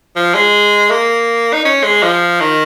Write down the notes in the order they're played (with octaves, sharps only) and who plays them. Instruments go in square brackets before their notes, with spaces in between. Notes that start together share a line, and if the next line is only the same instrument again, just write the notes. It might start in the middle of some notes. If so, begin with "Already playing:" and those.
[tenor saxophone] F3
G#3
A#3
D#4
C#4
G#3
F3
D#3